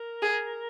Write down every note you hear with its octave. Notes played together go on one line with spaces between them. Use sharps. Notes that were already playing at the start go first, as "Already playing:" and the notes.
Already playing: A#4
G#4